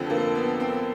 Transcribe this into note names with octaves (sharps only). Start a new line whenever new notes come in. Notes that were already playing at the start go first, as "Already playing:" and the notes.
Already playing: F1 F2 D3 F3 C4
A#3
B3
C4